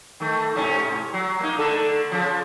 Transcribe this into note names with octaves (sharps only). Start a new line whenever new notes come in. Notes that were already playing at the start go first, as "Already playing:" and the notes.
D#3 A3
G#2 C3 C#4
F#3
A#3 D#4
D3 A3 A4
C#3 F3